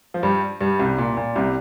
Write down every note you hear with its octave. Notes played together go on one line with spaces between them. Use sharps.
F3
G2 G3
G2 G3
C2 C3
A#2
A#2
C2 C3